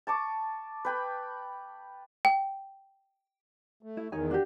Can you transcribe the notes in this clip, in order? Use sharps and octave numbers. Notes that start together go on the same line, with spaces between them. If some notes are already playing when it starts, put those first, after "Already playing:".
A5 C#6 D6
B4 G5 B5
G5
A3
E4
E2 D#3 D#4 C#5 G#5
D4 F#4 G4